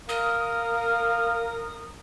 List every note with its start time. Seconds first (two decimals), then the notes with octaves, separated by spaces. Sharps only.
0.09 A#4 F5 D#6